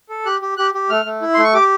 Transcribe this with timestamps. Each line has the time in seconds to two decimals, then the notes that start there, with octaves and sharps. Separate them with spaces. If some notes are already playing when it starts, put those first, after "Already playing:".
0.09 A4
0.26 G4 F#6
0.42 G4
0.57 G4 F#6
0.74 G4
0.90 A3 F6
1.05 A3
1.22 E4
1.34 A3 C6
1.44 C#6
1.54 G4 D6